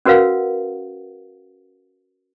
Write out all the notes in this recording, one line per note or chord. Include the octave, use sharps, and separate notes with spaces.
C#4 F#4 A#4 B4 F5 F#5